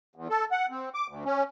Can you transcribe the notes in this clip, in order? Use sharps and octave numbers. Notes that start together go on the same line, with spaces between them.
E2
A4
F#5
C4
D6
D2
C#4